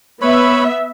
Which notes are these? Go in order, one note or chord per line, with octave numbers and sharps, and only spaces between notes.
B3 B4 C#5 E5 B5